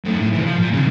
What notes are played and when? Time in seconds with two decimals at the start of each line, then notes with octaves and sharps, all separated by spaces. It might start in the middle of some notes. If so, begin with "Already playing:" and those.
0.05 F#2 A3
0.19 A2
0.33 C3 E3
0.46 F3
0.58 A#2
0.73 F2 C#3